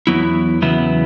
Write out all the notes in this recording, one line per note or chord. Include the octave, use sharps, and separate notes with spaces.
E2 C#3 F#3 B3 E4
E2 C#3 F#3 B3 E4